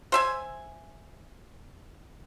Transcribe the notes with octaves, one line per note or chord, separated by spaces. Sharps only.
C5 E5 G#5